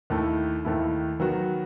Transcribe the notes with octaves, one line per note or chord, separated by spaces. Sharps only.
D#2 D#3 A3 E4
D#2 D#3 A3 E4
D#3 F#3 B3 F#4